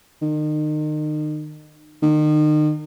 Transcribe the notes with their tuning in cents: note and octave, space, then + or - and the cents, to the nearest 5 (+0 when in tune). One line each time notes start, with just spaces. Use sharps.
D#3 -35
D#3 -35